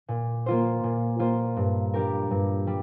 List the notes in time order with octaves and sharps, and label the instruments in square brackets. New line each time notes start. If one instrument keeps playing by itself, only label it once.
[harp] A#2
A#3 F4 C5
A#2
A#3 F4 C5
G2
G3 D4 G4 A#4
G2
G3